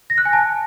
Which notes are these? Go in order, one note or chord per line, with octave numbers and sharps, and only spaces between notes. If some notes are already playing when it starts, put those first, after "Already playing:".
A#6
F#6
G#5
A5